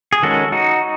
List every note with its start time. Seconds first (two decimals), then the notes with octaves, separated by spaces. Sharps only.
0.13 G#4
0.23 D#3 G#3 C#4 F#4 A4
0.52 D#4 F#4